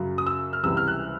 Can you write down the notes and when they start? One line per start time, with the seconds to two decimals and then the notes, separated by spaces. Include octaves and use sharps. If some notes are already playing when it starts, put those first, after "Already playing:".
Already playing: F#2 C#3 F#3
0.18 D#6
0.27 E6
0.53 F6
0.63 C#2 C3 E3 G3 E6
0.77 F6
0.88 F#6